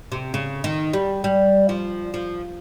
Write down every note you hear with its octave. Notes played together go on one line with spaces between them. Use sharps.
C3
C#3
D#3
G3
G3
F3
F3